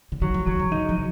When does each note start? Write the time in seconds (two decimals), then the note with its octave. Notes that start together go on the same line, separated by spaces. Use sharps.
0.12 C#3
0.22 D#3 F#3
0.34 F3
0.46 D#3 F#3
0.59 C#3
0.72 C#3 D#4
0.89 F3